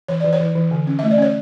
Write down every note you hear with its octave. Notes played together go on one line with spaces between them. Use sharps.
E3 C#5
E3 D5
C#5
E3
E3
D3
C#4
A3 E5
D5
C#4 C#5